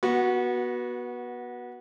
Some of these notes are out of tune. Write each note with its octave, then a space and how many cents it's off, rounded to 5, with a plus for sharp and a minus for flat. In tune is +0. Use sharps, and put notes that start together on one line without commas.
B3 -25 F#4 +0